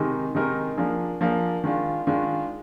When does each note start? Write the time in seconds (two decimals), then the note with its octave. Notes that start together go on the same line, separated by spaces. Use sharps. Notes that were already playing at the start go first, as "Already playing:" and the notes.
Already playing: C3 D#3 G#3 D#4 A#4
0.34 C3 D#3 G#3 D#4 A#4
0.77 F3 A#3 D4 G#4
1.21 F3 A#3 D4 G#4
1.64 D#3 G#3 D4 F4
2.07 D#3 G#3 D4 F4